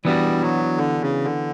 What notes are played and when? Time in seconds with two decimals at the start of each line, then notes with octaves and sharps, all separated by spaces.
0.05 E3 G3 B3 D4 F#4
0.42 F#3
0.77 D3
1.01 C#3
1.24 D3